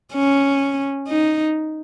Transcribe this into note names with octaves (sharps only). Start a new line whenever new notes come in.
C#4
D#4